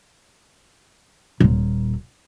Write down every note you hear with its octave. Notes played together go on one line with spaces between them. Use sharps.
D#1 A#2